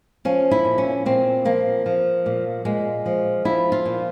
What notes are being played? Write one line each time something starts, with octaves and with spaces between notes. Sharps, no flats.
F3 C#4
E4
A#2
C#4
A#2 C4
F3 A#3
F3
A#2
A#2 G#3
F3
F3 E4
F4
A#2